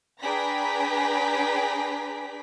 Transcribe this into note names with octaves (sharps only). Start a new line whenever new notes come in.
D4 G#4 B4 G5 A#5 B6